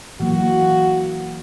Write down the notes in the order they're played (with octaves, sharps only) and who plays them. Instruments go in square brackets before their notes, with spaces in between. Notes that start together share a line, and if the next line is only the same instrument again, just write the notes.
[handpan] E3 F#3 A#3 [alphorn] F#4